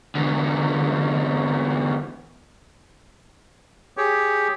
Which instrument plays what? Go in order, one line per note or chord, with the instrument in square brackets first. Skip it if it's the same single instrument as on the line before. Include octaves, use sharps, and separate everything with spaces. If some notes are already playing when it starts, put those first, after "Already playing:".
[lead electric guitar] E2 D3
[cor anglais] G4 [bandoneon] G#4 C#5